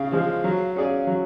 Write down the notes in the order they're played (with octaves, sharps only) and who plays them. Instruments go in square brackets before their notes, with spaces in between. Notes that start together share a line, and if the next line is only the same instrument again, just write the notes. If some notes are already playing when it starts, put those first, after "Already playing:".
Already playing: [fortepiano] C#3 [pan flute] F5
[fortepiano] F3 G#3
F#3
C#4 G#4 D5
F#3